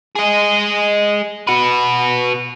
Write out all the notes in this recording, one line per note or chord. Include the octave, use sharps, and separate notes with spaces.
G#4 D#5
F#4 B4